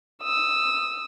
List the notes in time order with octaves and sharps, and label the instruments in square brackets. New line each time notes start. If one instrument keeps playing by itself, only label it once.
[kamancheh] D#6 E6